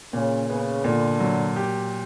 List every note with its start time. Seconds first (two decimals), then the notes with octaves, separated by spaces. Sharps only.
0.13 A#2 C#3
0.49 C#3 B3
0.84 A#2 D3
1.20 F#3
1.56 G4